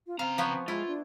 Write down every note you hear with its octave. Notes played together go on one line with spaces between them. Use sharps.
F4
C#3 C4 F5 A#5
F3 B3 C#5
G#3 E4 F4
D4